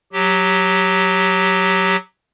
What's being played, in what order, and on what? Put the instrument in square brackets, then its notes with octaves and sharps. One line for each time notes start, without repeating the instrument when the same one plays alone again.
[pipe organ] F#3 G4